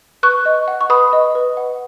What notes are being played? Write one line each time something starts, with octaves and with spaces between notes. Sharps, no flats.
B4 C#6 F#6
D#5
F#5
C#6
B4 B5 D#6
D#5
B4
F#5